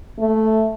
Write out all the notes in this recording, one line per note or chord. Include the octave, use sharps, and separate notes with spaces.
A3